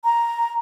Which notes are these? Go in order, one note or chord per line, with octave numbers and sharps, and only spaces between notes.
A#5